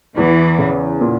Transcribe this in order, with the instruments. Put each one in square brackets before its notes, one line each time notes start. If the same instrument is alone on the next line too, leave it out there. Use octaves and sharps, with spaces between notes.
[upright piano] E2 [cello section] E3
[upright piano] C#3
A#2